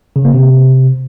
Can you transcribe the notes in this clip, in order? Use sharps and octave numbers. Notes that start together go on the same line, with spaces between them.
C#3
A#3
C3